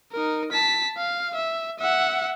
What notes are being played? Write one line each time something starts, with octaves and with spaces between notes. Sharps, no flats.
D#4 A#4
A5 B6
F5
E5
E5 F#5